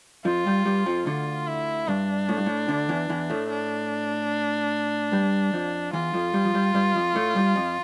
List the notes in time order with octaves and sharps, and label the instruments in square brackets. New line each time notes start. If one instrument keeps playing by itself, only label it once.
[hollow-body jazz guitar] F2 F3 [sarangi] F4
[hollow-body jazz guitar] G2 G3
G2 G3
F2 F3
[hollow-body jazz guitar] D2 D3 [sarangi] F4
[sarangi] E4
[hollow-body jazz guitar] G2 [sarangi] D4
[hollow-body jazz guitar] A2
G2
A2
D2 D3
E2 E3
E2 E3
A2 A3
[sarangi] D4
[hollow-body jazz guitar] G2 G3
F2 F3
[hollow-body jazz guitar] E2 E3 [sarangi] F4
[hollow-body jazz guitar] F2 F3
G2 G3
F3
G2 G3
G2 G3
F2 F3
A2 A3
G2 G3
F2 F3